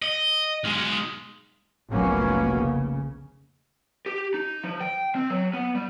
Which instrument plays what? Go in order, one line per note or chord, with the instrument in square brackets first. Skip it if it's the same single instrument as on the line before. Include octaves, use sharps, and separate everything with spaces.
[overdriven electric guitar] D#5
B1 G#3
[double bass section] F1 B1 F#3 A#3 B3 C#4
C#3
[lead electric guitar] G4
D#4
F3
G5
C4
F#3
B3
G3